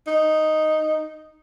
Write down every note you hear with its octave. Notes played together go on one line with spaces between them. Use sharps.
D#4